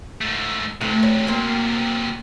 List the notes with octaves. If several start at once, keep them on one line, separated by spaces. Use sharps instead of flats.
G#2 A3
D2 C3 F#3 A3
C#5
A#3 C4